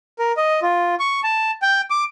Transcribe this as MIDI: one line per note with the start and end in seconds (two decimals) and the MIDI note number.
0.19 0.32 70
0.37 0.60 75
0.62 0.95 65
1.00 1.20 85
1.23 1.51 81
1.62 1.81 79
1.90 2.04 86